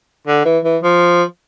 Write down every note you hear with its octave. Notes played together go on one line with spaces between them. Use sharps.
D3
E3
E3
F3